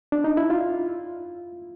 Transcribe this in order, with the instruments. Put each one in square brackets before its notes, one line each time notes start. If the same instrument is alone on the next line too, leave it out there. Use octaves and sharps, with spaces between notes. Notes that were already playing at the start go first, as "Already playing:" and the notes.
[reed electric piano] D4
D#4
E4
F4